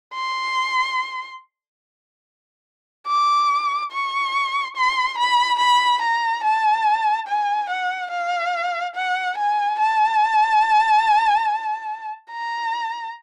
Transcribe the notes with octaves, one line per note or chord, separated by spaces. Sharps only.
C6
D6
C#6
C6
B5
B5
A#5
A5
G#5
F#5
F5
F#5
G#5
A5
A#5